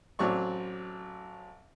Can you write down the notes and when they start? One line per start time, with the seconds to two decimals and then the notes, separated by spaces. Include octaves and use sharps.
0.19 A1 F#3 C4 D5 C#6